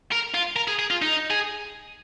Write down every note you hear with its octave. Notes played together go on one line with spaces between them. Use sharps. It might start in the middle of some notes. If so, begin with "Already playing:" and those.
A#4
F4
A#4
G#4
G#4
F4
D#4
G#4